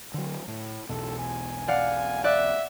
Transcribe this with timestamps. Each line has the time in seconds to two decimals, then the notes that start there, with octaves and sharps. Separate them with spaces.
0.14 D3 F#3
0.48 A2
0.89 B1 E2 B2 A4
1.19 G#5
1.68 D5 F5 F#5
2.24 D5 E5 F#6